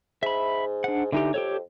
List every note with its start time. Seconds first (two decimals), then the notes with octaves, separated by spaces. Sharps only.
0.23 G#2 E5 B5
0.84 D4 F#5
1.12 D3 E3 D#4 G4
1.34 F2 G4 A4 C#5